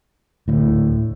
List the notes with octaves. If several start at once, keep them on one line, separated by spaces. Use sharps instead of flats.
D2 A2